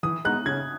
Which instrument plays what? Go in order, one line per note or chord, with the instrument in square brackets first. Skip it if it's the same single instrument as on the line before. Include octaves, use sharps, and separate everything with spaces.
[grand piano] E3 [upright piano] D#6
[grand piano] G#3 B3 D#4 [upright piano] F#6
[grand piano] C#3 [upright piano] G#6